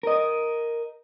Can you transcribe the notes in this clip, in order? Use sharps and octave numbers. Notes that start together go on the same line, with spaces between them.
A#4 D#5